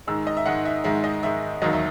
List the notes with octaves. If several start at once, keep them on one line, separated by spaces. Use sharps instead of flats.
G#2 D#3 G#3 E6
D#5
E5
G#2 D#3 G#3 F#5
E5
G#2 D#3 G#3 E5
D#5
G#2 D#3 G#3 E5
E1 D#2 D#3 F#3 D#5
E5